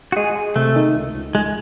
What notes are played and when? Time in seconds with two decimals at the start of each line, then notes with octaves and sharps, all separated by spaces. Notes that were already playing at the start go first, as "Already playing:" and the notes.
0.12 F#4
0.16 G#3 G#4
0.36 G#3
0.56 C3 A3
0.76 D#3
0.96 C#2
1.14 C#2
1.35 C#2 G#3